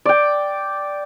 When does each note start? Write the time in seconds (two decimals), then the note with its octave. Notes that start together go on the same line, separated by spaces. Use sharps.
0.05 D5 G5